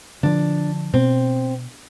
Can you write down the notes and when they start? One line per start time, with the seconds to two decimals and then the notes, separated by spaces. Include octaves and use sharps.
0.23 D3 F3 D4
0.94 B2 C4